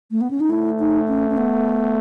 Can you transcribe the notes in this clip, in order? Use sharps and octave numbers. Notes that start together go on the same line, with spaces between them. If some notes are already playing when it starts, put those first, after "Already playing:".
A3
B3
C#4
D#4
A3 E4
D#4
C#4
C#4
B3